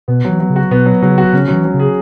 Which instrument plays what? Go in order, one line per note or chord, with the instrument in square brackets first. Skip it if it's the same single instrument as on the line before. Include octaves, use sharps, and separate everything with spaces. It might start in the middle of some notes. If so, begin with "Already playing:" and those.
[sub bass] B2 [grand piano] B3
[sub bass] E3 [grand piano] F#3
[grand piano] F#3
[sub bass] C#3
[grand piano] F#4
[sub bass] B2 [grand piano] B3
[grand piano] F#3
[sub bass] C#3 [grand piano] F#3
[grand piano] F#4
[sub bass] C#3 [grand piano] C#4
[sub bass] C#3 [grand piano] F#3
[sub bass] E3
[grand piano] F#3
[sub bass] C#3
[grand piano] G#4